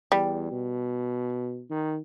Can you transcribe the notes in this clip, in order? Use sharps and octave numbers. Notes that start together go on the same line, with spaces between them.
E2 G3
B2
D#3